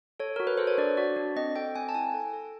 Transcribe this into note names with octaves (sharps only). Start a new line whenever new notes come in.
A4 C#5
F#4 A#4
B4
A4 C5
C#5
D4 D5
F#4 D5
D4
C4 D#5
A4 G5
C4 G#5
A5
E4 G#5
A4
A4